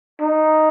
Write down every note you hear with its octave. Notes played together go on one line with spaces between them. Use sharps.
D#4